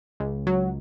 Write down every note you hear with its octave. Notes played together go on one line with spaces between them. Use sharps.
C#2
F#3